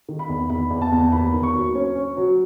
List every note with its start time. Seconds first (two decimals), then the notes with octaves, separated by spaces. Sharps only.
0.08 D#3
0.19 B5
0.29 E2
0.49 E2 B5
0.70 E2
0.82 A5
0.92 E2
1.12 D#2 B5
1.34 D#2
1.43 C#6
1.54 F#3
1.75 C#4
1.95 C#4
2.17 F#3